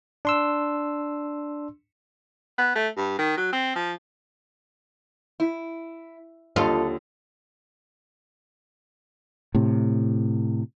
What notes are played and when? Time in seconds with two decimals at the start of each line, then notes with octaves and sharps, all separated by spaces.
0.25 D4 C6 E6
2.58 B3
2.75 A3
2.97 G2
3.19 D#3
3.37 F#3
3.53 C4
3.75 F3
5.40 E4
6.56 D#2 D3 F4 A4 D#5
9.55 A2 C3